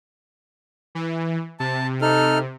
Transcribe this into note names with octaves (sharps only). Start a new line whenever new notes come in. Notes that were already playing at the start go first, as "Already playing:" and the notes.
E3
C3 A5
D#4 A4 F6